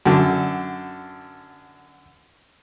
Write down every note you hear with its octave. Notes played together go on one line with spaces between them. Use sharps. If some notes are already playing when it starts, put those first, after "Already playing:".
F#2 D3